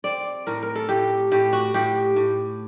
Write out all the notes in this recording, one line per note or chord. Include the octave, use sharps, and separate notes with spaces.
C4 D5
A2 A#4
A#4
A4
A2 G4
A2 G4
F#4
A2 G4
A2